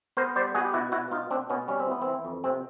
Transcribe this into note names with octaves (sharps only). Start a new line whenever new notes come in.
B3 A#4 C5
G3 C5 D5
B3 F#4 G#4
G4
B2 E4 F#4
B2 E4 F#4
B2 D#4 F4
B2 C4 D4
B2 B3 C#4
G3 C#4
C4
E3 B3
E3 C4
F2
C3 C4